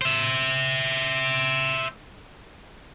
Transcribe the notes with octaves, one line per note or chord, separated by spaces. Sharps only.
C5 E5